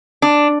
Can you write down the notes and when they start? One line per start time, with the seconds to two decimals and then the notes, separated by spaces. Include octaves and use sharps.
0.22 D4